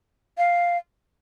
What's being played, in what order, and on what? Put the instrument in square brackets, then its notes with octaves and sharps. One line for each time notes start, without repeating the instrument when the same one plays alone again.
[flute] F5